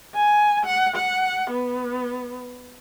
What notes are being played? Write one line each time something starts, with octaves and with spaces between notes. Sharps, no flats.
G#5
F#5
F#5
B3